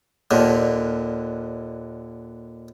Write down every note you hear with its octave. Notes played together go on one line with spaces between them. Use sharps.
D#2 A#2 D3